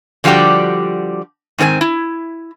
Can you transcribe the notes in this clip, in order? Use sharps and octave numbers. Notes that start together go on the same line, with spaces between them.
D3 F3 G3 F#4 G4 D5
G#2 D#3 C4 A4 G#5
E4